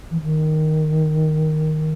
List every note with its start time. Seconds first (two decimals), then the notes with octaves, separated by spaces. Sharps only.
0.11 E3
0.22 D#3